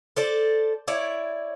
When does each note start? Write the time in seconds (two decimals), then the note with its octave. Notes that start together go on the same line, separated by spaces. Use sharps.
0.16 A4 C5 D5
0.88 E4 C#5 D5